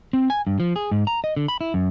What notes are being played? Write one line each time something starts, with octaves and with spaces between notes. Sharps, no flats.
C4
G#5
G2
F3
G#4
G#2
A#5
D#5
D3
B5
E4
F#2